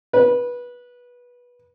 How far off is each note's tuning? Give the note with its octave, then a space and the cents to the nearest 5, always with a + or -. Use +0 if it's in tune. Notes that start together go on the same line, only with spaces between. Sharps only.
B4 -20